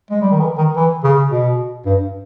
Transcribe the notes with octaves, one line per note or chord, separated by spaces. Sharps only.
G#3
G3
D#3
E3
D#3
E3
C#3
B2
G2